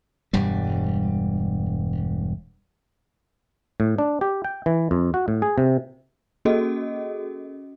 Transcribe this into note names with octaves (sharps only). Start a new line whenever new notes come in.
E1 G2 G3
A2
D4
G4
G5
E3
F2
F#4
A2
G#4
C3
A#3 C#4 F#4 G#4 A4 D#5